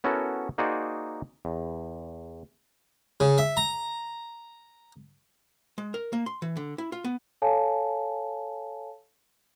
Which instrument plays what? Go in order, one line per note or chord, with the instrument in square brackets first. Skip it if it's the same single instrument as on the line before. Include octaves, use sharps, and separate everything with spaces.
[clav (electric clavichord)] B3 C#4 E4 F#4 A4 A#4
A#3 D#4 F#4 G#4 C5 D5
E2
[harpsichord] C#3
E5
A#5
[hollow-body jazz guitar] G#3
A#4
A#3
C6
E3
D3
E4
F4
B3
[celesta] A4 C#5 F5 G#5 A5